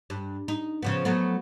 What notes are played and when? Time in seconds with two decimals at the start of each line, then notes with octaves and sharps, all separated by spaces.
0.10 G2
0.48 D#4
0.82 C#3 F3 B3
1.05 F#3 A3 B3